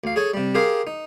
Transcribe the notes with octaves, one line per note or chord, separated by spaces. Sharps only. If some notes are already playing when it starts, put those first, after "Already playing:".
D2 F5
G#4 A4 C#5 G#5
C3 G3
G4 G#4 A#4 C5 F5 G#5
D#4